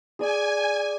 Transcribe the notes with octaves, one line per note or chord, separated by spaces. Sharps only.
G#4 D5 G#5